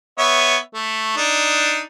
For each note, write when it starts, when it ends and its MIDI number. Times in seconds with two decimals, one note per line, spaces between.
0.18 0.57 59
0.18 0.57 73
0.18 0.57 76
0.74 1.15 57
1.17 1.81 62
1.17 1.81 63